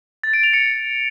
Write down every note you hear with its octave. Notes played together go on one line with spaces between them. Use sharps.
A6
D7
F7
C#7